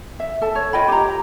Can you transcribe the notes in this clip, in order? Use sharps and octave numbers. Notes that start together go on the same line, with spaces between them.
E5
A4 A5
C#5
F4 D#5 G5 B5
G4 A#5